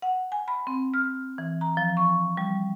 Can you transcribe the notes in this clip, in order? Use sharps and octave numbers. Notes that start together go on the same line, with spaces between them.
F#5
G#5
B5
C4
F6
E3
A#5
F3
C#6
G3